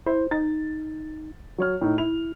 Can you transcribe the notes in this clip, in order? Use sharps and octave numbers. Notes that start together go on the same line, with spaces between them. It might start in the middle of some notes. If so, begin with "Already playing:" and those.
E4 C5
D#4 A6
F#3 C#5 F6
A2 D#4
E4 F7